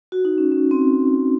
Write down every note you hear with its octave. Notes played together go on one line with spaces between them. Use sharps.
F#4
D#4
C#4
C#4
C4